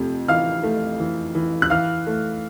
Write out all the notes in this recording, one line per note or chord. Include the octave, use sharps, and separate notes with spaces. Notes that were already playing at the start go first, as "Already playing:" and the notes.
Already playing: F2 C3 A3
E3 F5 F6
A3
E3
E3
F#6
E3 F5 F6
A3